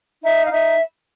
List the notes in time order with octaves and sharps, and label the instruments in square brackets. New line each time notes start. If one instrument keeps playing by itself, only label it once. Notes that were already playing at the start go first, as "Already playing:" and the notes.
[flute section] D#4 E5
F5
D#4 E5